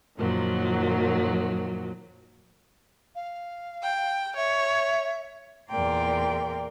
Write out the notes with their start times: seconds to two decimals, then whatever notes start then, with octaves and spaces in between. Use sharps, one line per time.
0.17 F#2 A#2 D#3 F3 F#3
3.15 F5
3.83 G5
4.37 C#5 E5
5.69 E2 A#2 A#4 D5 G5 C6